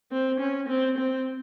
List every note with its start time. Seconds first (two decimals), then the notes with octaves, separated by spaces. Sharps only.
0.12 C4
0.39 C#4
0.68 C4
0.98 C4